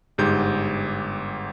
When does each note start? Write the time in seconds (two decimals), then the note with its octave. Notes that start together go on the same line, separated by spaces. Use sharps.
0.18 G1 G#2 G4 G6